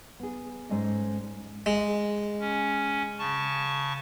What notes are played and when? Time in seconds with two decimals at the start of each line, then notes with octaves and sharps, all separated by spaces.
0.20 B3 G#4
0.69 G#2 G#3 C#4 A4 D5 D#5
1.66 G#3
2.40 C#4
3.19 C#3 A5 C#6